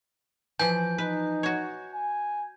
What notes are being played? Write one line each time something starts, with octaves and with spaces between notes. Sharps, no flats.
E3 F3 G#5 G6
D#4 B4
F#4 C#5
G#5